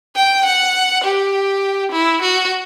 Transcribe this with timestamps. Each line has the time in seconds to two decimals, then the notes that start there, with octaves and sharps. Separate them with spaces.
0.16 G5
0.45 F#5
1.05 G4
1.91 E4
2.21 F#4